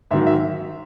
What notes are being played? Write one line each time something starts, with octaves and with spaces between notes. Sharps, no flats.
G#2 D#3 F#3 E5
E5